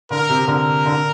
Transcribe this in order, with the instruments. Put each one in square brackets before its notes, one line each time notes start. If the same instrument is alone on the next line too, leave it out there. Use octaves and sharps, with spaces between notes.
[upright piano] D3 [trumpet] A#4
[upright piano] C3
[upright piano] D3 [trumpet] A#4
[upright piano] D3